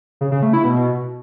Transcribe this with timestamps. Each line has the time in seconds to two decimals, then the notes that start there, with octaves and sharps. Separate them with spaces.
0.21 C#3
0.32 C#3
0.42 A3
0.53 E4
0.64 B2